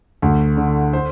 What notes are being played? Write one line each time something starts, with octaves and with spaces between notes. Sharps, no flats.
D2
D3
C5